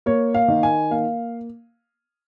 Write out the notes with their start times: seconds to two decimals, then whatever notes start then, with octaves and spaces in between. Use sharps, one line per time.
0.06 A#3 C#5
0.34 F5
0.48 D#3
0.63 G#5
0.91 A#3 F5